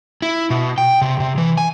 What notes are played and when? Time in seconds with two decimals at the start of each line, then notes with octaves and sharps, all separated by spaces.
0.22 E4
0.50 B2
0.78 G5
1.02 C3
1.20 C3
1.38 E3
1.58 G#5